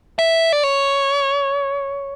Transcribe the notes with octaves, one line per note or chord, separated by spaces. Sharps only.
E5
D5
C#5